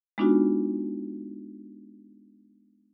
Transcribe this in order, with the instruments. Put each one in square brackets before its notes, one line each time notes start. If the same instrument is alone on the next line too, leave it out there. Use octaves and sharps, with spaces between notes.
[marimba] G#3 B3 D4 D#4 F4 F#4